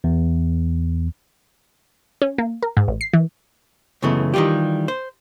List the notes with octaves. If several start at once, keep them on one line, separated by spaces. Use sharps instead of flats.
E2
C#4
A#3
A#4
G#2
A1
C7
E3
C#2 F#2 C#3 E3 A3 B3
D#3 E3 G3 F4 G4
C5